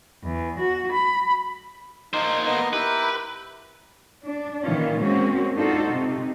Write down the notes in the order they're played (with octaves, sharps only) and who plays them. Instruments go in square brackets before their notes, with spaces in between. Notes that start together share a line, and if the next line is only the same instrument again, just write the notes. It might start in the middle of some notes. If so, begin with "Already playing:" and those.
[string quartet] E2
F#4
B5
[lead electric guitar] A#3 C5 [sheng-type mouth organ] D#4
[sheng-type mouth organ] B3 D#4 D#5
[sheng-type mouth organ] E4 G4 A#4 [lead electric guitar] B4
[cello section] D4
A#2 D#3 E3 C#4 F4
G#3 A#3 C4 C#4 F#4
D4 D#4 F4 F#4 A4 C5
C3 D#4